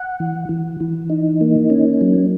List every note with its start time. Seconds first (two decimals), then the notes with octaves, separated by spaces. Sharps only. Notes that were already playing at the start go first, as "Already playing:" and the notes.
Already playing: F#5
0.20 E3
0.49 E3
0.80 E3
1.10 D#4
1.41 A#3
1.70 C#4
2.01 F#3